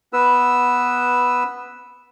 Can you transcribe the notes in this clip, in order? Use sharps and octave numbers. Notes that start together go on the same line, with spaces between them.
B3 B4 E6